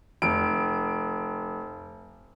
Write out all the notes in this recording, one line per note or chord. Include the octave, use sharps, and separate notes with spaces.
F1 D7